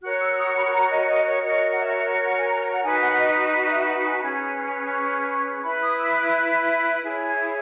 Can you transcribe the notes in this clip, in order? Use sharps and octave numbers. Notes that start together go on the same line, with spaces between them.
F#4 A#4 C#5 F#6
E6
E6
D#6
B5
A#5
D#5
D#5
C#5
F#4 A#4 C#5 D#5
F#5
E5
F#5
G#5
A#5
F#5
D#4 F#4 B4 G#5
F#5
D#5
D#5
D#5
D#5
E5
F#5
G#5
A#5
C#4 G#4 B4 G#5
C#6
E4 B4 B5
D#6
E6
F#6
F#6
E4 G#4 C#5 F#6
G#6